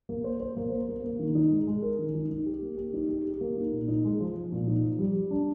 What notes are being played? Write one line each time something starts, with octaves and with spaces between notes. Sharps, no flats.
A#3
C5
C5
A#3
C5
A#3
A#3
D#3
D#4
G#3
G#3
A#4
D#3
D#4
D#4
G4
A#3
G4
D#4
G4
G4
A#3
D#4
A#2
D#4
G#3
F3
F3
A#2
D#4
F3
G3
G3
D4